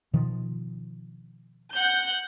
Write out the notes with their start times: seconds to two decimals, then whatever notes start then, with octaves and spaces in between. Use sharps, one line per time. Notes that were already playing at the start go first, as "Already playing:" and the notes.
0.13 B2 D#3 F3
1.74 F#5 G6